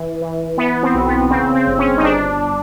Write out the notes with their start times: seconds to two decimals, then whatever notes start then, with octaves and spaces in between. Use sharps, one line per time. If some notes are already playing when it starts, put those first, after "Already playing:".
Already playing: E3
0.21 E3
0.58 E3 B3
0.83 C4
0.94 B1
1.07 B3
1.30 C#3 C4
1.55 C4
1.67 G1
1.79 C#4
1.97 D#4
2.03 G1 D4